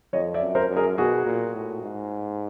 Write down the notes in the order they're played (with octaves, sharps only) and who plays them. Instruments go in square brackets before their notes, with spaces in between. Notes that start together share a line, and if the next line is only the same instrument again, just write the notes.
[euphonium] F2 [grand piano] C#5 D#5
[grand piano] D5 E5
[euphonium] F#2
[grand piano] A#4 C5
[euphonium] F#2
[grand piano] G#4 A#4
[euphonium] B2 [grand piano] F#4 G#4
[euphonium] A#2
A2
G#2